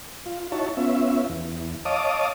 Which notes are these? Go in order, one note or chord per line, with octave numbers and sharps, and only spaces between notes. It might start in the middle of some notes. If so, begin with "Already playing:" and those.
F4
D#4 E4 F#4 C#5 A5
B3 C#4 F4 E5
E2
C#5 D#5 F5 A5 D6 D#6